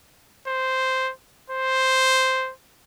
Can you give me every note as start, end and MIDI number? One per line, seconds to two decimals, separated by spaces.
0.48 1.12 72
1.50 2.52 72